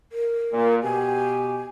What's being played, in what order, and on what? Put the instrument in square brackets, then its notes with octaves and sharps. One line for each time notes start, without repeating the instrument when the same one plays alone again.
[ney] A#4
[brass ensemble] A#2
[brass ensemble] B2 G4 [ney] G#5